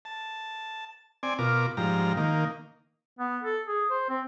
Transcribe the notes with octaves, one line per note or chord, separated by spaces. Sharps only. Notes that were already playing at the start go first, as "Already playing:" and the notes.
A5
C4 D5 G#5
B2 F4 A#4 D6
G#2 F3 G3 A#5
D#3 A#3
B3
A4
G#4
C5
C4